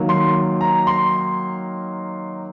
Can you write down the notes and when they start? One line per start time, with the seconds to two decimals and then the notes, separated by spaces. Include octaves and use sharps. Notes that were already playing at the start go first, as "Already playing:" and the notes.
Already playing: D#3 F#3 A#3
0.09 C6
0.61 A#5
0.87 C6